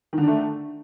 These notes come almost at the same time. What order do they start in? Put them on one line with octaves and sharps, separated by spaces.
D#3 D3 D4 A3